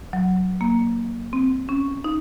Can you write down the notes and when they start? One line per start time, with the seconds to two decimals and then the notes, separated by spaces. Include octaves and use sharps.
0.13 F#3
0.61 A#3
1.33 C4
1.69 C#4
2.04 D#4